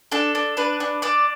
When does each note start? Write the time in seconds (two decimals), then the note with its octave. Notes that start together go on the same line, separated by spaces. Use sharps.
0.12 D4 A4
0.35 D4
0.57 D4 B4
0.80 D4
1.02 D4 D5